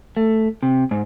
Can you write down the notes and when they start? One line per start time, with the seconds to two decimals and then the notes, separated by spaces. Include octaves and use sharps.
0.17 A3
0.63 C3
0.91 G#2